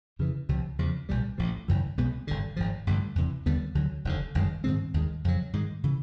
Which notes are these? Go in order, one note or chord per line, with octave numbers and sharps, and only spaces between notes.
F2 C#3 E3
C#2 C3 F3
E2 C#3 F3
B1 A#2 G3
A1 A2 F3
G#1 F#2 C#3 E3
B1 B2 G#3 B3
G#1 G2 D3
G#1 G#2 F3
A1 G2 D3 G3
E2 C3 E3
D#2 D3 G3 B3
D2 D3 F#3
F1 D#2 D3
G1 F#2 D#3 G#3
G#2 D#3 G#3 C4
D#2 D#3 G#3
F2 C#3 F#3
G#2 D#3 G#3
C#3 E3